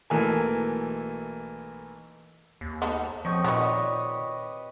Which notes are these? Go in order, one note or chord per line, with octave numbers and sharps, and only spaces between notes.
B1 E3 F#3 A3 A#3 G#5
D#2
B3 D#4 A4
F3 C4 C#5 D#5
A#2 D#3 F#3 G4 B4 D#5